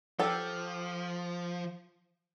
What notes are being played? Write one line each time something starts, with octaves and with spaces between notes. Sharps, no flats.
F3 G4 A4